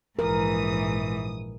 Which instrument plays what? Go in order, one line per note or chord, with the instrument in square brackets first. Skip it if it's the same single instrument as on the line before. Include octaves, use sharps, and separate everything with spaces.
[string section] A#1 D#6 [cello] G#2 E3 [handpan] A#4